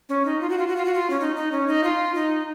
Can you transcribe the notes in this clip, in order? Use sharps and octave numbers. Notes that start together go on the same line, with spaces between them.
C#4
D#4
F4
F#4
F4
F#4
F4
F#4
F4
C#4
D#4
D#4
C#4
D#4
F4
D#4